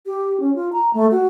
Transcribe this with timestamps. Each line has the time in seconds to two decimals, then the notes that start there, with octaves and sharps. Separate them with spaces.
0.06 G4
0.40 C#4
0.55 F4
0.73 A#5
0.94 A3
1.11 F#4